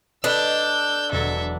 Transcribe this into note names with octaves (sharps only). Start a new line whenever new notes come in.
D4 A4 B4 D#5 E6 G6
E1 F#3 A4 E5